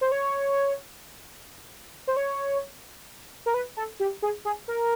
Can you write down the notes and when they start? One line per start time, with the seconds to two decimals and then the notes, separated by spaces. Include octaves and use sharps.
0.01 C5
0.12 C#5
2.07 C5
2.17 C#5
3.46 A#4
3.54 B4
3.77 A4
4.00 G4
4.22 G#4
4.45 G#4
4.68 A#4